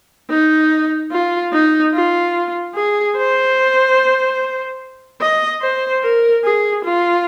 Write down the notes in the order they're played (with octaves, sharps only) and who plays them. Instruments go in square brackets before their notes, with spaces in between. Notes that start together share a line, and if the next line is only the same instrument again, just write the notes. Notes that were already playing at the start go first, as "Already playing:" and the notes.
[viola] D#4
F4
D#4
F4
G#4
C5
D#5
C5
A#4
G#4
F4